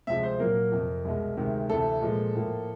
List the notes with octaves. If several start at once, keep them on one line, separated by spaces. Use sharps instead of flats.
D2 C3 F3 G#3 E5
C5
A#2 F#3 A#3 A#4
F2 C3 F3
C2 B2 G#3
D2 C3 D#3 G#3
D2 C3 E3 A4
A#2 F3 G#3
A2 F3 A#3